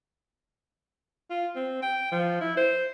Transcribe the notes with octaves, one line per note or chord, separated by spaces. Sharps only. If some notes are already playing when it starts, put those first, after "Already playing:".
F4
C4
G5
F3
E4
C5